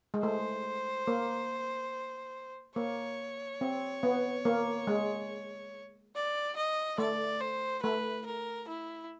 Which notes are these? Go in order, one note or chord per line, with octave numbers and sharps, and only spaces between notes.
G#3
A3 C5
A#3
A#3 C#5
C4
B3
A#3
G#3
D5
D#5
A3 D5
C5
A3 B4
A#4
E4